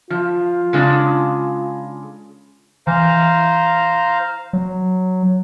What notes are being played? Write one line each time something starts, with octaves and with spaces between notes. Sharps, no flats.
F3 F4
C#3 G#3 D4
E3 C5 F5 A#5
F#3